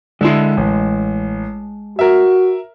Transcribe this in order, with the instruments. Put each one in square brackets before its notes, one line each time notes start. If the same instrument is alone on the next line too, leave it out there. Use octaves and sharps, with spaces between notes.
[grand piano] D3 E4 [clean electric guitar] G#3 A5 C6
[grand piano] A1
[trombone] F#4 [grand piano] A#4 E5